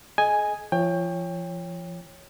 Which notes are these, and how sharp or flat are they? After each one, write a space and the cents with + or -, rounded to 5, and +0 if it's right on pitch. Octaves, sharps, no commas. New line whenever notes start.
G#4 +40 D#5 +0 G#5 +0
F3 -30 C#5 +0 G5 +25